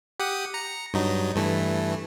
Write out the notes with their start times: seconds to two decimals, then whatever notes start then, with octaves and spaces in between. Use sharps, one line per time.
0.20 G4 F#5 D#6
0.54 A#5 C#7
0.94 G2 F#3 D#4
1.36 G2 E3 A3